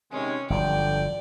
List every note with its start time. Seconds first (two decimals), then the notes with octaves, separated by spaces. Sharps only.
0.12 C3 D#3 G#3 C#4
0.50 G1 D3 F3 F#3 D5 G5